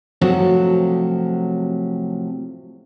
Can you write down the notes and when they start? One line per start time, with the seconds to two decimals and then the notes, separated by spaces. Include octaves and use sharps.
0.21 A2 C3 F3 F#3 F#4 A4